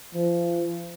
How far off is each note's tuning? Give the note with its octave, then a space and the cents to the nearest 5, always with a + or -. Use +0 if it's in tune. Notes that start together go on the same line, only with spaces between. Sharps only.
F3 -30